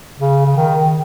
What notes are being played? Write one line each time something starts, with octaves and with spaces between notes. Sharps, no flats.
C#3
C#3
D#3